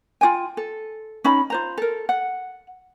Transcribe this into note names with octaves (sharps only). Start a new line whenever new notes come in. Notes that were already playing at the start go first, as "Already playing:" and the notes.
F4 F#4 G5 G#5
A4
C#4 D#4 B5
F4 C5 A#5
A4 A#4
F#5